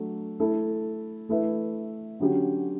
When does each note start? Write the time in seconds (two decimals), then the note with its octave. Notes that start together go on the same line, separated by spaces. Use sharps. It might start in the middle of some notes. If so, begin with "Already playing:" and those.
Already playing: F#3 A3 D4
0.40 A3 E4 A4
1.29 A3 E4 B4 E5
2.20 D3 F#3 C#4 G4